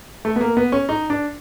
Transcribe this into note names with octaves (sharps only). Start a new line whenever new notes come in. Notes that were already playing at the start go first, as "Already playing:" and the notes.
A3
B3
A#3
B3
C#4
D#4
D4